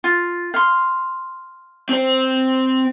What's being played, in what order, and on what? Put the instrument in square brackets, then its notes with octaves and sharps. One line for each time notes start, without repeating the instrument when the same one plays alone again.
[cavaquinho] F4
F5 C6
[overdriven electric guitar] C4 C5